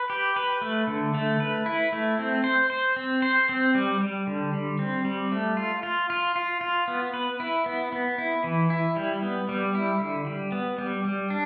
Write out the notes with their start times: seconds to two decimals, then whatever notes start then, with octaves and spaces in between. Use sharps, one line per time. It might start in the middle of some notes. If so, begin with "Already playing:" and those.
Already playing: B4
0.10 G4
0.36 B4
0.62 A3
0.87 D3
1.14 A3
1.40 B4
1.66 E4
1.93 A3
2.19 C4
2.44 C5
2.70 C5
2.96 C4
3.22 C5
3.49 C4
3.75 G3
4.01 G3
4.27 D3
4.53 G3
4.79 C4
5.05 G3
5.32 A3
5.57 F4
5.83 F4
6.10 F4
6.36 F4
6.61 F4
6.88 B3
7.14 B4
7.40 E4
7.66 B3
7.93 B3
8.18 E4
8.44 E3
8.70 E4
8.96 G3
9.23 B3
9.49 G3
9.75 E4
10.00 D3
10.27 G3
10.52 B3
10.78 G3
11.05 G3
11.30 D4